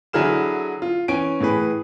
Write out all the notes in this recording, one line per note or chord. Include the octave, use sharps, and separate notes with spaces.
D3 F#3 E4 G#4 F6 E7
F4
E3 C#4 G#5 D7
A2 E3 G#4 B4